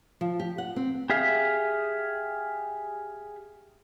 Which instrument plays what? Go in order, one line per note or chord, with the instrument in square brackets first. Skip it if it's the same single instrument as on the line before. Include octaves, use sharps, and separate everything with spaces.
[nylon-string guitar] F3
G4
F#5
C4
[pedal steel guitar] G4 G#4 E5 F5